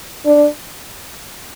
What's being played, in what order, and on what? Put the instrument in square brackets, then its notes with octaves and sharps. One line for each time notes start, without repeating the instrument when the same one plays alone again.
[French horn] D4